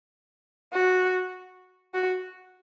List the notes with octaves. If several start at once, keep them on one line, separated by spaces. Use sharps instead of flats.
F#4
F#4